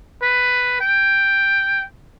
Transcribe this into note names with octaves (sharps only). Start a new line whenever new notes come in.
B4
G5